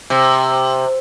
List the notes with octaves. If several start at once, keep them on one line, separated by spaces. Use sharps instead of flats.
C3